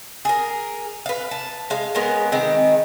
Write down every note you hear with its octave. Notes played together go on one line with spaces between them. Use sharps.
G#4 A#4
B4 F5
A5
G#3 F5
G#3 B3 C#4 A#4
D#3 G#3 B3 C4